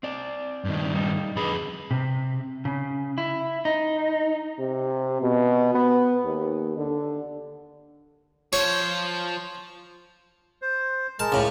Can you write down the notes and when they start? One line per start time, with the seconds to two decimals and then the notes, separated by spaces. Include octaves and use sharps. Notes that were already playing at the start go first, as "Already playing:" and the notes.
0.03 C4 D5
0.65 G2 D#3
0.95 G3 D#4
1.36 F2 D3 G#4 B4 B5
1.91 C3
2.65 C#3
3.18 E4
3.65 D#4
4.59 C3
5.22 B2
5.75 B3
6.25 D#2
6.77 D3
8.53 F3 C5 C#5
10.62 C5
11.19 G#3 A#4 A5
11.32 C#2 A2